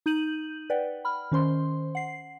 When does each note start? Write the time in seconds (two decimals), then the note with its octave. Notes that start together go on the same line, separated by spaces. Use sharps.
0.06 D#4 G6 D#7 F#7
0.70 B4 D5 F#5 G5
1.05 B5 F6
1.32 D#3 C#4 C5 C6
1.95 F#5 C7